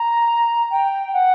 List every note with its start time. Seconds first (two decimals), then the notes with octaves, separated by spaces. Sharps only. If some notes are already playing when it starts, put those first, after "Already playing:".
Already playing: A#5
0.71 G5
1.13 F#5